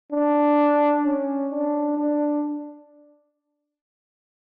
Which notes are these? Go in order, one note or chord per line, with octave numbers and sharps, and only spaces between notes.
D4
C#4
D4
D4